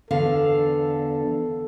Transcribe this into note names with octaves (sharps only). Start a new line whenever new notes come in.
E2 D3 A4 F5